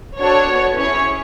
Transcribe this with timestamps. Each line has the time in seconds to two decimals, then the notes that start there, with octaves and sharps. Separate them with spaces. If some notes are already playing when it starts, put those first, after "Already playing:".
0.21 D4 F#4 A4 C#5
0.50 B3 F#4 A4
0.79 C#4 E4 G#4 C#5